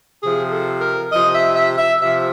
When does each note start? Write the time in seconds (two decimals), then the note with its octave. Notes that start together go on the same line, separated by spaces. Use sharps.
0.21 C3 F3 G#4
0.51 A4
0.81 A#4
1.10 C3 F3 D#5
1.33 E5
1.55 E5
1.77 E5
2.00 C3 F3 E5